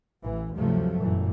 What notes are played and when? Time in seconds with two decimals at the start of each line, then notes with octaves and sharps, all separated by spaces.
0.24 A1 E3
0.58 D2 G2 C3 F3 F#3 A3
0.99 G1 F#2 A#2 E3